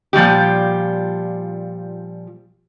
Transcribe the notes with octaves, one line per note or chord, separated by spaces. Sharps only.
A#2 F3 G3 G4